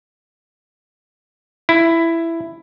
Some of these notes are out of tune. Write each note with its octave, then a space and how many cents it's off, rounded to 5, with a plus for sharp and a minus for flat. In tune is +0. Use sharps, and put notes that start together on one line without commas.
E4 +10